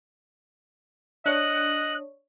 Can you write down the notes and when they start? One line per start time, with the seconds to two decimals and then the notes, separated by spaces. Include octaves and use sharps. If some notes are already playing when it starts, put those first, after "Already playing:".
1.26 D4 C#5 D#5 F#6